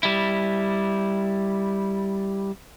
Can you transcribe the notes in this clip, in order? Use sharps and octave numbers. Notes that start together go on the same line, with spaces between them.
G3 E4